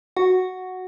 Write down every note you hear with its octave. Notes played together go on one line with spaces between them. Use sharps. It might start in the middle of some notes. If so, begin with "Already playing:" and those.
F#4 F#5